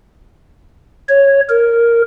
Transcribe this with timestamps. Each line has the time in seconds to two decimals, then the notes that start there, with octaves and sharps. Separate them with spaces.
1.09 C#5
1.49 A#4